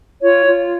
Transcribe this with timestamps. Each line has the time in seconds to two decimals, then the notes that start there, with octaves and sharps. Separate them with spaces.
0.21 F4 C#5
0.45 F4